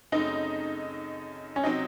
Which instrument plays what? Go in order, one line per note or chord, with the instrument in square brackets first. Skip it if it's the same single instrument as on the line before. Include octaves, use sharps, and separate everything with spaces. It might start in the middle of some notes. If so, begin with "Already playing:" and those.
[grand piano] F#2 C#3 A3 C4 [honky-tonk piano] D#4
[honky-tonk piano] C#4
[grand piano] C3 F#3 C4 [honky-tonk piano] D#4